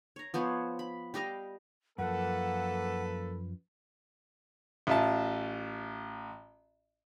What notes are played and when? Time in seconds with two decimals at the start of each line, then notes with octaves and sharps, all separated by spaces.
0.16 C#5 A#5
0.34 F3 B3 C5 C#5
0.79 B5
1.14 G3 G4 D#5 F5
1.98 F#2 F3 A#3 A4 B4 F#5
4.87 A1 F4 E5 A5